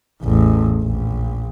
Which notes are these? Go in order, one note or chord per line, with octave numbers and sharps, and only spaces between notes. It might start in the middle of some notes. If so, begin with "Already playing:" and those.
A1 E2
A#1